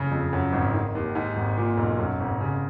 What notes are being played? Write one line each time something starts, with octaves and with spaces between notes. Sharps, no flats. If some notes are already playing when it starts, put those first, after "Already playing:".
Already playing: F#1 F2 C#3
F2
F#2
G#1
D#3
D#2
G#2
G#1
A#2
B1
F#2
G#1
C#3